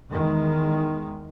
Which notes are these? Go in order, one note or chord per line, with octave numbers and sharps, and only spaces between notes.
E2 D#3 G#3